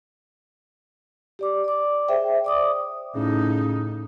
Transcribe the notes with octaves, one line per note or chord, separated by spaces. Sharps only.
G4 D5 D6
D5 D6
G#4 C5 E5 G5
D5 D6 D#6
A2 C#3 D#4